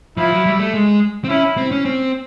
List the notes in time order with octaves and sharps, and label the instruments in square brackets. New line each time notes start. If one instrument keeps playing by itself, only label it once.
[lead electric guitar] F3 [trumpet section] E4
[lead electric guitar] F#3
G3
A3
G#3
C4
[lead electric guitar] C#4 [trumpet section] E4
[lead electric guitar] C4
C#4
C4